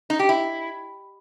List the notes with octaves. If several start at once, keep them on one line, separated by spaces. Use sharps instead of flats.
D#4
G4
E4